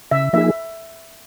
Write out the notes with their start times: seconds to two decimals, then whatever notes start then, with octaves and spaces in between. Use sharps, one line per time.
0.11 C#3 E5
0.33 F3 A#3 D#4 G#4 E5